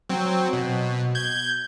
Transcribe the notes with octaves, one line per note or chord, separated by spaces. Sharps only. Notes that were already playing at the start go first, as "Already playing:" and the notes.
F#3 C4
B2
G6 G#6